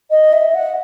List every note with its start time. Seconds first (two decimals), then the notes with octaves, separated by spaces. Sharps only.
0.10 D#5
0.33 E5
0.54 F#5